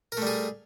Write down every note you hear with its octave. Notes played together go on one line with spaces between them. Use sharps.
G3 A3 G#4 A#4